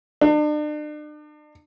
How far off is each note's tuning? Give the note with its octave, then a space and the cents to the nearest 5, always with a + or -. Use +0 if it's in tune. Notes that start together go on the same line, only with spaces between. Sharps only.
D4 +40